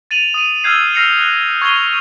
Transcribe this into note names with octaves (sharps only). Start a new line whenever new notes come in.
A6 D#7 F7 F#7
D#6 D#7
E6 F6 G6 G#6 C7
E6 F6 A#6 C7 C#7 F7
F#6
C#6 G#6 C7 F7 G7